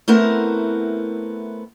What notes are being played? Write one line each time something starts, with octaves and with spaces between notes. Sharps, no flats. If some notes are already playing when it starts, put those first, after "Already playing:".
A3 B3 C4 E4 A#4 F#5